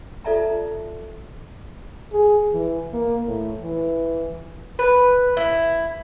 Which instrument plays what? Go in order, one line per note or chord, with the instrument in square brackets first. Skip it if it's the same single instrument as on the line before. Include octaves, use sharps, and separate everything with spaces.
[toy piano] F4 A4 D5 E5 A5 A#5
[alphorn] G#4
E3
A#3
A2
E3
[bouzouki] B4
E4